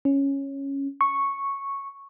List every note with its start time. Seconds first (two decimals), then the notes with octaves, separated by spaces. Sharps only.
0.05 C#4
1.01 C#6